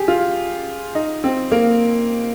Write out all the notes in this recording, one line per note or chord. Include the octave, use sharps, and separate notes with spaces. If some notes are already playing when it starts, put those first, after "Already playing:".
Already playing: G4 G#4
F4
D#4
C4
A#3